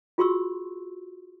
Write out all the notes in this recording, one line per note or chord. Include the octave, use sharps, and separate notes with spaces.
F4 F#4 G#4 C6 C#6 E6